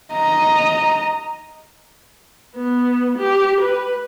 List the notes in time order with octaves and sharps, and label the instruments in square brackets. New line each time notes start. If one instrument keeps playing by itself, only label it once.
[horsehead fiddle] D#5 A#5
[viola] B3
G4
B4